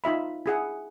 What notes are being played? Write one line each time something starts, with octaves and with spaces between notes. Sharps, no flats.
D#4 F4 E5 B5
E4 G#4 F#5